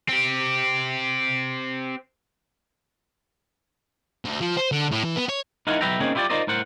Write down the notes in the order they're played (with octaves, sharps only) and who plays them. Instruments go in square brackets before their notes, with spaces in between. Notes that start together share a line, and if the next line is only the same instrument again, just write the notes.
[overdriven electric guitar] C4 G4
[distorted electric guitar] D2
F3
C5
D3
A2
E3
B3
C#5
[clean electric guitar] D#4 E4 A#4 F5 F#5 G#5
B1 F#3 B4 E5 G5 A#5
A#3 C4 C#4 D#4 G#4
E4 F4 G4 C#5 D5
D#4 F4 A#4 C5 D5 D#5
A2 A#4 C5 F#5